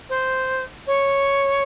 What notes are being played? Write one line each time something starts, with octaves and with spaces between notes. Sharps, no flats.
C5
C#5